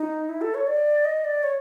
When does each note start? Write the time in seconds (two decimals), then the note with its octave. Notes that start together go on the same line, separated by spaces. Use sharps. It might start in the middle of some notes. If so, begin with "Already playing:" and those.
Already playing: D#4
0.29 E4
0.41 A4
0.54 C#5
0.67 D5
1.05 D#5
1.24 D5
1.43 C#5